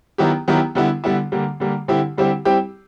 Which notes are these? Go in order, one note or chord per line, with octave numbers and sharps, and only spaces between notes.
D#3 F#3 B3 E4 G4
D#3 F#3 B3 E4 G4
D3 G3 B3 E4
D3 G3 B3 E4
D3 G3 A#3
D3 G3 A#3
D3 G3 C4 E4 G4
D3 G3 C4 E4 G4
G3 C4 E4 G4